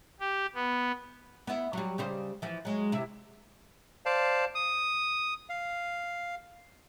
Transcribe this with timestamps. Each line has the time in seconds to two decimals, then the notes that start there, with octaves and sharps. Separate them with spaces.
0.20 G4
0.55 B3
1.47 B3 E4
1.73 F#3 G3
1.98 C#3 G3 C5
2.42 E3 F3
2.65 F#3 G#3
2.92 C3 E4
4.06 C5 D5 F5 A5
4.55 D#6
5.49 F5